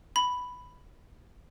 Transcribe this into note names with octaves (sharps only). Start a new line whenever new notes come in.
B5